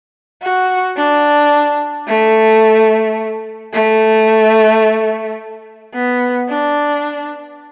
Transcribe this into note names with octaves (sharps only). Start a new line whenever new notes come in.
F#4
D4
A3
A3
B3
D4